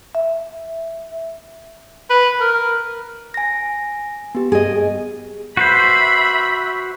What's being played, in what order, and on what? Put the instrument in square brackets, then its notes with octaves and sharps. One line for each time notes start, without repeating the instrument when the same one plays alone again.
[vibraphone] E5
[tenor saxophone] B4
A#4
[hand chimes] G#5 A#6
B3 G4
[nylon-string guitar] G#4 D#5 [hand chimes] G#5
[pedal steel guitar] F#4 B4 C5 [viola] E5 B5